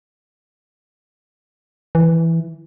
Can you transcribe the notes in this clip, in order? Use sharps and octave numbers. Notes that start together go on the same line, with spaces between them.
E3